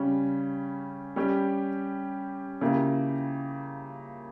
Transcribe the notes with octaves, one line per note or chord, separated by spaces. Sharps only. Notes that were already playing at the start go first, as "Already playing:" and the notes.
Already playing: C#3 G3 C#4
G3 C#4 G4
C#3 F3 A#3 E4 G4